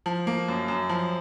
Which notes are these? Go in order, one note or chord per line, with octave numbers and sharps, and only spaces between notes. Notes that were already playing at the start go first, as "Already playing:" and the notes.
F3
A#3
F#2
F#2
F3